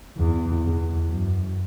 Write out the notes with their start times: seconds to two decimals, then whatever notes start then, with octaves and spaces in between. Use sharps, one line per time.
0.17 E2
0.64 E2
1.11 F#2